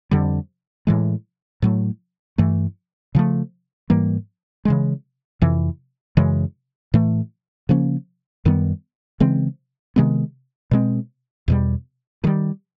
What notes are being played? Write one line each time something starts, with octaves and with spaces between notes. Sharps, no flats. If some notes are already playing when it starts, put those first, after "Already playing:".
F2 D3 G3
A2 E3 G#3
A2 F#3 A3
G2 E3 A3
C#3 F3 A3
G#2 E3 G3 A#3
C#3 E3 G#3
F2 C3 E3
F#2 C#3 E3 G#3
A2 E3 A3
C#3 F3 A#3 C#4
F#2 D#3 G3 B3
C#3 E3 G#3 C4
C3 D#3 G#3 B3
B2 G#3 C4
E2 B2 G3
G2 D#3 G3